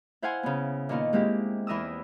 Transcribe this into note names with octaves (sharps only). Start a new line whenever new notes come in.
E4 C5 F5 F#5 G#5 C6
C#3 B3
A#2 D#3 B3 D#4 F4
G#3 A#3 C4 E4 G4
E2 E3 A#4 D#6 E6